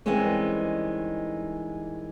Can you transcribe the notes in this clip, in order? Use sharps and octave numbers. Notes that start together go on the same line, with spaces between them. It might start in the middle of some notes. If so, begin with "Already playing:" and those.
D#3 E3 G3 G#3 C4 C#4